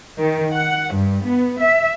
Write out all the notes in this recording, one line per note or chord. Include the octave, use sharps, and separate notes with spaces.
D#3
F#5
G2
B3
E5